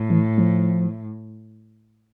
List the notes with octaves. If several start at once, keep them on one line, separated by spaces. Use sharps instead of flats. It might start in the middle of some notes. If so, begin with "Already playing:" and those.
Already playing: A2
E3
F3